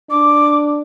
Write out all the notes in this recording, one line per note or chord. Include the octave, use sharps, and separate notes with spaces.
D4 D6